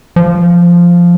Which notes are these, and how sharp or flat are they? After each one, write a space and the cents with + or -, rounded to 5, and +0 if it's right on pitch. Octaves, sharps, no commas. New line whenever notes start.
F3 -5